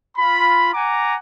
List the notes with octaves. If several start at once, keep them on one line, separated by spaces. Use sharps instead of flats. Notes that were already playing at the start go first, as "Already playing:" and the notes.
F4 B5
F#5 G#5 A#5 D6